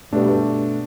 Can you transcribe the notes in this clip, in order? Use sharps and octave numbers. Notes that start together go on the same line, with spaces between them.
G2 B2 A3 D4